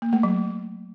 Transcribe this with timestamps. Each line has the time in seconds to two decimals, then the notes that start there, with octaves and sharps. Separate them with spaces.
0.02 A#3
0.13 A3
0.23 F#3